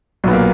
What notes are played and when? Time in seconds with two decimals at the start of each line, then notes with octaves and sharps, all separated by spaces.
0.24 B1 A#2 F#3 B3
0.33 A#3